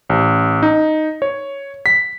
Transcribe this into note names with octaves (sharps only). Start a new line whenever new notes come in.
A1
D#4
C#5
B6